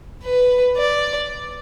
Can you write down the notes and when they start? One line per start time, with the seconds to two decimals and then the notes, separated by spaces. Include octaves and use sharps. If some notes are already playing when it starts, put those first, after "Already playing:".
0.23 B4
0.77 D5